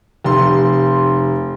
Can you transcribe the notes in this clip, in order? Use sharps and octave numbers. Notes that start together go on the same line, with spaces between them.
F1 C6